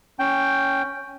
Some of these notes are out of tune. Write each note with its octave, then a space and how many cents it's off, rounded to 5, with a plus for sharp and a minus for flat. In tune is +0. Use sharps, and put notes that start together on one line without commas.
C#4 +0 G5 +0